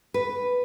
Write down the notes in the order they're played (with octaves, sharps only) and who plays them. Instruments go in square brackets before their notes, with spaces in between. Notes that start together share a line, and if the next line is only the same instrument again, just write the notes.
[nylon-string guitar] B4